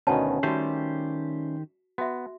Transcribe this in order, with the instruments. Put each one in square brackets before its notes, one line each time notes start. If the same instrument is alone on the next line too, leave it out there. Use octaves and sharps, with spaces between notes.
[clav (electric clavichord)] D2 B2 D#3 [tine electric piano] C#4 [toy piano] A5
[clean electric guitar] D#3 G4 C5 [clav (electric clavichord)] G3 A3 [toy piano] F#4
[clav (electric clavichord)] B3 [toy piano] F#4 E5